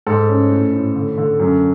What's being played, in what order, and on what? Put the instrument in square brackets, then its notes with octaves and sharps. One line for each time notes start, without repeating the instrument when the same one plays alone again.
[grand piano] G#2 A4
C#4
A2
A2
D3
D3
F#2